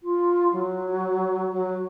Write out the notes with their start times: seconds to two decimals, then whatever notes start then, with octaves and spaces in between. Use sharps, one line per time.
0.03 F4
0.53 F#3
1.52 F#3